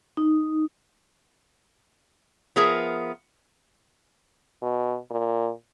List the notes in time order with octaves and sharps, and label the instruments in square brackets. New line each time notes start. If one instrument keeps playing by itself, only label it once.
[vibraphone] D#4
[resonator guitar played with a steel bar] F3 B3 G#4 A#4 E5
[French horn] B2
A#2